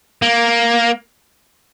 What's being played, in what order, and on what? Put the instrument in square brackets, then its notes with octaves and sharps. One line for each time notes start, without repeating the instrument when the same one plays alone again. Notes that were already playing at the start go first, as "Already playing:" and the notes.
[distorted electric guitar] A#3